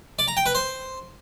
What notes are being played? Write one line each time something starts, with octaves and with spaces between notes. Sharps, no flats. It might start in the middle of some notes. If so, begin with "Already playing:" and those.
D5
A#5
G5
B4
C5